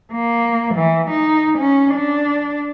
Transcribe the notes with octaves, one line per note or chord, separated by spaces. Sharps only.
A#3
E3
D#4
C#4
D4